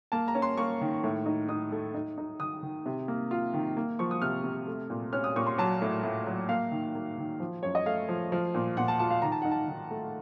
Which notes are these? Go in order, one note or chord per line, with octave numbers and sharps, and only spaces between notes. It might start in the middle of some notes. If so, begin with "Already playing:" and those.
A#3 A5
A#5
C#4
C6
A#3 C#6
D#3
A2
D#4
D#4 D#6
A3
D#4
D#4
D#3 D#6
D#3
C3
A#3
F4
D#3
A#3
F3 C#6
D#6
C3 F6
C3
A3
A#2
C#4 F6
D#6
A#2 C#6
C6
F#3 A5
A2
A2
F#3
A#3 F5
D#3
A#3
D#3
F3
F#2 C#5
D#5
A3 F5
F3
F3
A#2
A#2 F#5
A5
F4 A5
F5
D#3 A#5
A5
D#4 F#5
A5
D#3
A3